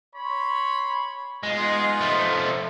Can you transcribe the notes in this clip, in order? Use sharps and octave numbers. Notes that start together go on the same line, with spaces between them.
C#5 B5 C6
G#3 B3 D#4 F4
F3 A3